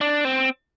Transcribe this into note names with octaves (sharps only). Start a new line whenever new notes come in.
D4
C4